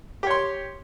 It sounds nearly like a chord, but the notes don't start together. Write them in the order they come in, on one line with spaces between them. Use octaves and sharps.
G4 C#5 C6